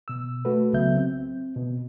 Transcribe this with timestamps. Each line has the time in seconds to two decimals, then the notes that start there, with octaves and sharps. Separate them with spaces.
0.08 B2 E6
0.45 A3 F#4 A4 B4
0.73 C2 C#3 F#3 B3 E5 G6
0.95 C4
1.56 B2